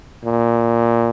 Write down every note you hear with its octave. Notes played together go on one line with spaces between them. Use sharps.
A#2